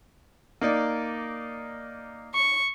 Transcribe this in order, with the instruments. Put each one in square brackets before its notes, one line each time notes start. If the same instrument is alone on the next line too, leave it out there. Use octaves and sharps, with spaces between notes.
[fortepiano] A#3 D#4 D5
[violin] C#6